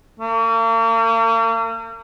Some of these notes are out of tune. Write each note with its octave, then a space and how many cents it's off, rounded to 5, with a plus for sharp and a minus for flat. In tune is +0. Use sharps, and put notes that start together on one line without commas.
A#3 -40